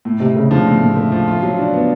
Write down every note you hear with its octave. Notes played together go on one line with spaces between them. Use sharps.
A2
A2 C3
C#3 A3
D3 F3
A2
A2
A3
F3
F4
F#3
D4
B3